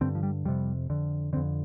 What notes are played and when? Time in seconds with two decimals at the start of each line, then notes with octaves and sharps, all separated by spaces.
0.01 G2 D3 C4
0.15 F3
0.23 G3
0.45 F2 C3 G3
0.90 F2 D3
1.33 D3 C4
1.37 F2